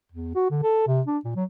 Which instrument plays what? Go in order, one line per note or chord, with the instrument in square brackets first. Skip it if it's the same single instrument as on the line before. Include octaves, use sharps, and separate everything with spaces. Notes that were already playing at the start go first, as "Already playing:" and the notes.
[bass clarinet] E2
F#4
D3
A4
C3
D4
A#2
F#3